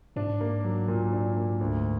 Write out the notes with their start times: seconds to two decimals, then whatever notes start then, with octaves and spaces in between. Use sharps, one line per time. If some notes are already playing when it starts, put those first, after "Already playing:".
0.16 G#2 D4
0.41 A#3
0.64 F#3
0.88 A#2
1.13 D4
1.37 A#3
1.61 D2